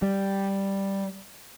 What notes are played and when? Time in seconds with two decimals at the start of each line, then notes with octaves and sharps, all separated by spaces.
0.02 G3